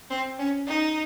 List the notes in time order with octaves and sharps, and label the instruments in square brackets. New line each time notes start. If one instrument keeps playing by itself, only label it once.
[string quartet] C4
C#4
D#4